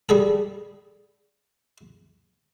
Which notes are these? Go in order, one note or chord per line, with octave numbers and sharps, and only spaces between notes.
G3 G#4 A4